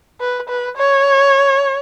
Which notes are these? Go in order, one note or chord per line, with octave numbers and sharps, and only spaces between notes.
B4
B4
C#5